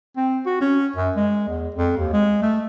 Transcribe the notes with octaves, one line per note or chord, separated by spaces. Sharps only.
C4
F#4
C#4
F#2
G#3
E2
F2
D#2
G#3
A3